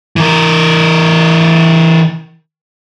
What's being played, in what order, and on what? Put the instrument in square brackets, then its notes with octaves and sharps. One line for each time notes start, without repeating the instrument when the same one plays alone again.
[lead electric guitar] E3 A#4